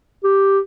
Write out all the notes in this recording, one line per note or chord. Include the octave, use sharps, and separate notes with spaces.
G4